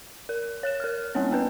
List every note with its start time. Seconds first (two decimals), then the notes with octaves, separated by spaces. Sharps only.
0.29 A#4
0.63 C#5 F#6 E7
0.80 A#4 F6
1.15 G3 A#3 C4 C#4 C#5
1.31 B3 C#4 B4